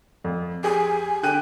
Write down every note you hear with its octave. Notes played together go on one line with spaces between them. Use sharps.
F2
G4 G#4 G#5
D3 G5 F#6 D#7